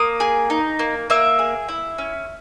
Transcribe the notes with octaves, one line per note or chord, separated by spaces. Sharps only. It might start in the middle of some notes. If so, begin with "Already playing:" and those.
Already playing: A#3 D#6
G#4
D#4
A#3
A#3 E5
G#4
E4
C#4